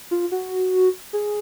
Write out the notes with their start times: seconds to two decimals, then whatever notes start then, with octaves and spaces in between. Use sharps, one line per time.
0.11 F4
0.32 F#4
1.13 G#4